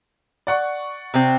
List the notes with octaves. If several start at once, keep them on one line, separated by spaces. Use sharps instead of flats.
D5 F#5 C#6
C3 C4